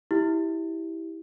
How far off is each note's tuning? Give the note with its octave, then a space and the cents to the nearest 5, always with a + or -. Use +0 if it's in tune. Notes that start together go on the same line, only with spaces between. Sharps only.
E4 -15 G4 -5